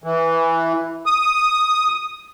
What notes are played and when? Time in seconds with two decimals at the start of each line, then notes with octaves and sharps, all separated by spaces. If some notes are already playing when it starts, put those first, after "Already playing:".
0.04 E3
1.06 D#6